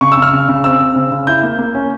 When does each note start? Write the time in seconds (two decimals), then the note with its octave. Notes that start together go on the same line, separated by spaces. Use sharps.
0.01 C#3 C#6
0.12 E6
0.17 C#3
0.22 F6
0.33 C#3
0.49 C#3
0.64 C4 E6
0.80 C4
0.96 C#3
1.11 C#3
1.27 E4 G6
1.43 A#3
1.59 A#3
1.75 C#4